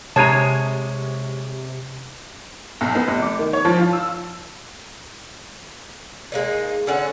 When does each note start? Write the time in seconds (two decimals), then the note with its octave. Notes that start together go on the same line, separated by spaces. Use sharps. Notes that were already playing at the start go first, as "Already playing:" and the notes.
0.16 C3 G#3 C#5 A5 A#5 D#6 G#6 D#7
2.81 B1
2.95 B3
3.08 F1
3.22 D6
3.39 D#3
3.53 C#5
3.65 F3
3.79 F4
3.93 E6
6.32 G#3 A#3 D#4
6.87 D3 C#4 F#5